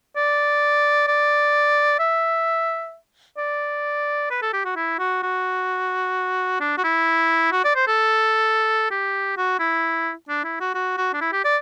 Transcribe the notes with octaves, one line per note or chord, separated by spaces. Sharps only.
D5
D5
E5
D5
B4
A4
G4
F#4
E4
F#4
F#4
D4
F#4
E4
F#4
D5
C5
A4
G4
F#4
E4
D4
E4
F#4
F#4
F#4
D4
E4
G4
D5